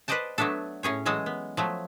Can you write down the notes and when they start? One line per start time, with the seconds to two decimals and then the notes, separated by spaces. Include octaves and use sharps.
0.08 B4 C5 D5 D#5 G5 A5
0.38 F#3 A3 B3 D4 A4
0.83 A2 C#4 G#4 C#5
1.05 E3 F#3 G#3 A4 D#5
1.26 B3
1.57 F3 F#3 A3